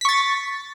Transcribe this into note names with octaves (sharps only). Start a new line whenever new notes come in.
C#6 A6 B6